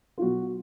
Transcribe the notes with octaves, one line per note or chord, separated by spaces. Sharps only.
F4
B2 F#3 F#4